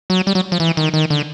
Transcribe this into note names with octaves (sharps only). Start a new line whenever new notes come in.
F#3
G3
F#3
F3
E3
D#3
D#3
D3